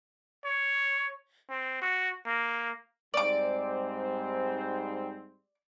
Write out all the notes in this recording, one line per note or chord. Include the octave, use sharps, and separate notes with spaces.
C#5
C4
F#4
A#3
G#2 G3 C4 D5 D6